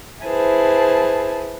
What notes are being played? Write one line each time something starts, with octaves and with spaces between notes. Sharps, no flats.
E4 G#4 B4 C5 A5